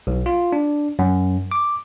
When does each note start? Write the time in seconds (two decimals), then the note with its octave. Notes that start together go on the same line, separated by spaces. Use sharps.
0.07 B1
0.26 F4
0.53 D4
0.99 F#2
1.52 D6